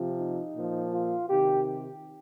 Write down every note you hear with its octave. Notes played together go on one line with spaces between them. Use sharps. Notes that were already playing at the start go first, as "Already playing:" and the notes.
Already playing: C3 F3
D#4
A#2 F3
F4
C3 D#3 G4